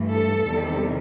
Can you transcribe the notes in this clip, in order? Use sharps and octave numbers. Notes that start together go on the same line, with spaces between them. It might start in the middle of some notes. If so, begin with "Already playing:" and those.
Already playing: G2 E3 A3
A4
E2 C3 D#3 G3